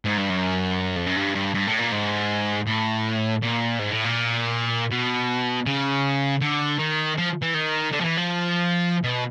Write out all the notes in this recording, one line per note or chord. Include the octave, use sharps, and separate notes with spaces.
G#2
G2
F#2
F2
F#2
G2
G2
G2
A2
A#2
G#2
A2
A#2
G#2
A2
A#2
B2
C#3
D3
D#3
F3
E3
D#3
D3
F3
E3
F3
B2